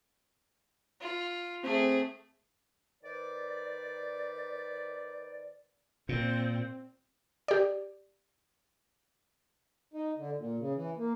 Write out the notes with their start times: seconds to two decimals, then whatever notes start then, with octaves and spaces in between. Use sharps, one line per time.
1.01 F4
1.64 A3 C4 G#4
3.03 D#3 B4 C5 D5
6.09 A#2 C4
7.48 G4 D5
9.94 D#4
10.17 D3
10.38 A#2
10.59 C#3
10.74 E3
10.97 A#3